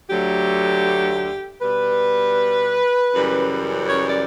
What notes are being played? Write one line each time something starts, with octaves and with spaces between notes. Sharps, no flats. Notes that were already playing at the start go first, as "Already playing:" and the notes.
D2 D3 F#3 A3 G4
B2 G3 B4
F#2 C#3 E3 G3
C#5
D5